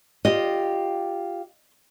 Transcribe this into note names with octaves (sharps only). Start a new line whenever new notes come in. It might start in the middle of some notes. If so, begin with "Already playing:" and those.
F4 G4 D#5